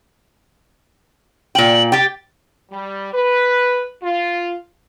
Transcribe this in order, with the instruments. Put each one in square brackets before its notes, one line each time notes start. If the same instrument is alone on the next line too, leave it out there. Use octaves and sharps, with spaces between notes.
[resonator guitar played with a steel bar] A#2 G5 [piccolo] F#7
[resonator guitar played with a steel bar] G4 G5 [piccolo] A6
[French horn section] G3
B4
F4